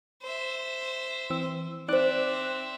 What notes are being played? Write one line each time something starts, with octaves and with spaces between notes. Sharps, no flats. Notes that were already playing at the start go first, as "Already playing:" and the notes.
C5 E5
E3 C4 E6
C4 D#4 C5 D5 E5 D6 F#6